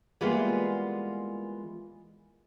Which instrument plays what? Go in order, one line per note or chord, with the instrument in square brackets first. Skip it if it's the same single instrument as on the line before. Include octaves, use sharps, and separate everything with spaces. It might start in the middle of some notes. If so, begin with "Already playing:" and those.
[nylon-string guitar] E3 G3 G#3 A#3 B3 F4